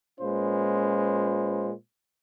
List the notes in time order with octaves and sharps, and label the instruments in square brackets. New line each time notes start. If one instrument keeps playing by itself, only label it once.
[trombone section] A#2 G#3 C#4 F4 B4 C5